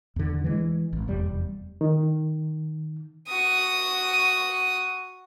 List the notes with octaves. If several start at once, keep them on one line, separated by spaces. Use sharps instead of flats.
E2 D3
E3 F#3 G#3
G#1
F1 E2 G3
D#3
F#4 D#6